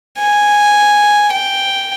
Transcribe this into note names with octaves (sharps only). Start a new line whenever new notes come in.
G#5
G5